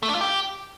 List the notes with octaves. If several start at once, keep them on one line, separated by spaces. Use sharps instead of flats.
A3
D4
F4
G4